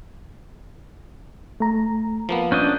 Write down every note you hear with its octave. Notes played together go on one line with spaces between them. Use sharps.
A3 A#5
F3 A#3 B3
C#4 D4 D#5 G6